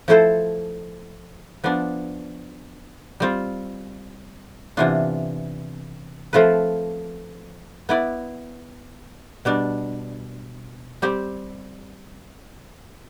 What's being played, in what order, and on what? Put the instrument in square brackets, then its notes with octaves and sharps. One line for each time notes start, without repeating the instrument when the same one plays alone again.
[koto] F3 A3 E4 A4 C5
F3 B3 D4
G3 C4 F4
C3 E3 B3 D4 F4
F3 A3 C4 F4 B4
B3 E4 B4 D5
B2 G3 D4
G3 C4 G4